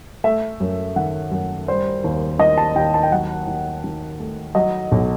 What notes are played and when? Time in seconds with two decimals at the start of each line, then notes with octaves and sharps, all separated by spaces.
0.24 A3 E5
0.60 F#2
0.96 D#3 F#5
1.31 F#2
1.68 G3 C5
2.04 D#2
2.39 D#3 D#5
2.58 A5
2.76 D#2 G5
2.94 A5
3.03 G5
3.12 F#3 F#5
3.47 D#2
3.84 D#3
4.20 A3
4.55 F#3 D#5
4.92 B1